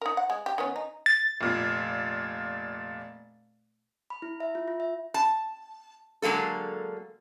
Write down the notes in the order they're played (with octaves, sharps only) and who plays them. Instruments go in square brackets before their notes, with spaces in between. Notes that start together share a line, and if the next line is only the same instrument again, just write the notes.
[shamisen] D#4 A#4
F#5
G#3
G4
D#3 B3 C#4
D#4
[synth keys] A6
[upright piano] F1 A#2
[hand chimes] B5
E4
E5
F4
F4
E5
[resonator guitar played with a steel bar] A5
D3 F#3 G#3 A#3 A4